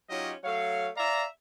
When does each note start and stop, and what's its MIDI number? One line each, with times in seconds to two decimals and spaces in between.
0.10 0.33 54
0.10 0.33 61
0.10 0.33 63
0.10 0.33 65
0.10 0.33 67
0.10 0.33 75
0.44 0.89 54
0.44 0.89 57
0.44 0.89 73
0.44 0.89 77
0.97 1.25 74
0.97 1.25 76
0.97 1.25 77
0.97 1.25 82